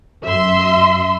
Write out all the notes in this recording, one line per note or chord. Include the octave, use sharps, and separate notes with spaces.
F#2 E5 C6